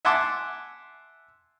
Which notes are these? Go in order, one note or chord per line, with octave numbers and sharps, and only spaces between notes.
E5 F#5 G#5 A5 C6 D6